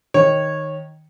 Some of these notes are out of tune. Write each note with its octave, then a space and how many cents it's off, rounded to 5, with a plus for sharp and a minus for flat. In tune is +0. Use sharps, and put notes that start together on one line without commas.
D#3 +0 C#5 -15